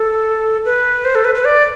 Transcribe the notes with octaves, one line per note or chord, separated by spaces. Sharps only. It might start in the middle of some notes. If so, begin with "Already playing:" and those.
Already playing: A4
B4
C5
A4
B4
B4
D5